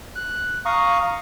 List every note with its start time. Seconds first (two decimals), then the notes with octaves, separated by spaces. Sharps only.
0.16 F#6
0.65 F5 A#5 C#6 D#6